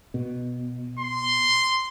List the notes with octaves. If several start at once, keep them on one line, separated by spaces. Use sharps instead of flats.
B2
C6